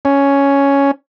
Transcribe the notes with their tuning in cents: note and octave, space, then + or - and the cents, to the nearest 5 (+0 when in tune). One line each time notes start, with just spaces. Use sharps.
C#4 +5